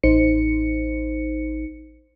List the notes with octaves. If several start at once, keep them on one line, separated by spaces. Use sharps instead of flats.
A1 D#4 C5 C#7